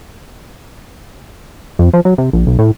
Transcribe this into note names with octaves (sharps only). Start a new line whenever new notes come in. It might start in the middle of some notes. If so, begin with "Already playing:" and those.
F2
F3
F#3
C3
A#1
B1
A2